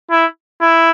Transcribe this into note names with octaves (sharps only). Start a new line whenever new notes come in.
E4
E4